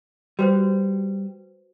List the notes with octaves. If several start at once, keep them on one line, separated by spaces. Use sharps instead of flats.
G3 F#4 B4 C5